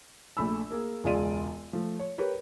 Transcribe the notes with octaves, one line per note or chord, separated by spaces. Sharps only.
A#1 A3 B5 E6
A#3 G#4 A#4
E1 C#2 G#3 F4 D5 D#7
F3 A3
C#5
G4 A#4 B4 C#5